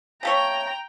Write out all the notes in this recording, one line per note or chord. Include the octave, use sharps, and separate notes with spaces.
C#3 A3 C#5 G5 A#5